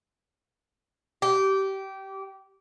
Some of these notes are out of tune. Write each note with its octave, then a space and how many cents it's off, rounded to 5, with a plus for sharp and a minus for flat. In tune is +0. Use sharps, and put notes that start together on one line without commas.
G4 -20